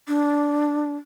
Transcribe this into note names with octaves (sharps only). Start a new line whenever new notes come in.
D4